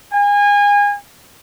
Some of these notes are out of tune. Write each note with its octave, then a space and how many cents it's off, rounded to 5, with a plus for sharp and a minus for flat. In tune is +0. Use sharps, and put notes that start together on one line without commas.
G#5 -30